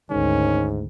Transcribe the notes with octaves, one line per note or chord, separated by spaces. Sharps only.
G#1 D2 G#2 D#3 C#4